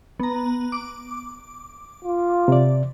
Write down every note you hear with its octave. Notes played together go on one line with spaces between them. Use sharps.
B3 A#5
D6
F4
C3 D5